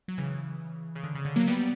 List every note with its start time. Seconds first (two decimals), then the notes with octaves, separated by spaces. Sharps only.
0.08 F#3
0.18 C#3 E3
0.95 C#3
1.04 D3
1.15 C#3
1.25 D3
1.36 F#3 A#3
1.47 G3 B3